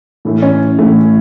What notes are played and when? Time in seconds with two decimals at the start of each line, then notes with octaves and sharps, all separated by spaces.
0.25 A2 E3 A3
0.42 C#4
0.78 A2 E3 A3